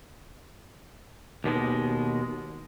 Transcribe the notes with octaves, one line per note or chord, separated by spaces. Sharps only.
D#2 B2 G#3